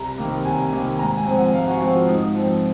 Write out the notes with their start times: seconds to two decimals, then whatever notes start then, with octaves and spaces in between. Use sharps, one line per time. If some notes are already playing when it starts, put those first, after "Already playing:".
Already playing: C2 A#5
0.18 C3 D#3 A#3
0.45 C2 G#5
0.73 C3 D#3 A#3
0.99 G#2 A#5
1.17 G#5
1.26 F3 G#3 C4
1.36 F#5
1.54 G#2 F5
1.68 F#4
1.81 F3 G#3 C4 F#4
1.95 F4
2.09 G#2 D#4
2.35 F3 C4